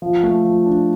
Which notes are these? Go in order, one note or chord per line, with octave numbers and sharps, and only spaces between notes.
F3
A3
F3
D4